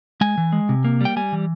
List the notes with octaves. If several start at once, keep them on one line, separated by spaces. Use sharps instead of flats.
G#3 G#5
E3
G#3
C3
A#3
G3 G5
G3 G#5
E3